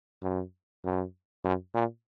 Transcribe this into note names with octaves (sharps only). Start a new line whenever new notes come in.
F#2
F#2
F#2
A#2